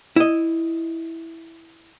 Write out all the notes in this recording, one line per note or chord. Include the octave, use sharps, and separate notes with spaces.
E4 D#5